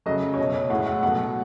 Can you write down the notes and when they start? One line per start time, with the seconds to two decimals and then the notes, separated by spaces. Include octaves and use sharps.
0.06 C#3 F#3 A3 D#5
0.34 C#5
0.38 B2 F#3 A3 D#5
0.54 C#5
0.70 A2 G#3 F#5
0.87 F#5
1.03 B2 F#3 A3 F#5